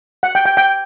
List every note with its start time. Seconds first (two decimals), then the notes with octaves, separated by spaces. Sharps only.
0.23 F#5
0.35 G5
0.45 G5
0.57 G5